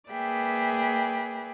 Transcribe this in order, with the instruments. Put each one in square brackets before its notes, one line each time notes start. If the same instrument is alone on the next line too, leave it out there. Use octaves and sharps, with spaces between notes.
[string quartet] A#3 G#4 B4 D5 E5 G5